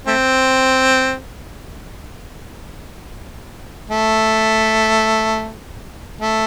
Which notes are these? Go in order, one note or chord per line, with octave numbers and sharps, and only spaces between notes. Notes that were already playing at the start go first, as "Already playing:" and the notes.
A3 C4
A3
A3